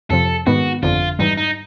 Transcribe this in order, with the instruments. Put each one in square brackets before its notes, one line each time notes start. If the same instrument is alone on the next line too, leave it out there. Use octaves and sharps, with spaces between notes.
[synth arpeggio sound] F2 C3 F3 [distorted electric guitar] A4
[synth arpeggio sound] G#2 D#3 G#3 B3 [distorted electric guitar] F#4
[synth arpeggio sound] G1 F2 D3 [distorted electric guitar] F4
[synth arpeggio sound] G#2 E3 G3 [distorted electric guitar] D#4
[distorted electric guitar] D#4